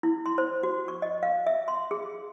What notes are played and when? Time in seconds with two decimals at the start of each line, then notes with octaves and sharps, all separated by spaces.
0.03 E4
0.26 C6
0.38 C5
0.63 F#4
0.88 C#6
1.02 D#5
1.23 F5
1.47 E5
1.68 C6
1.91 G#4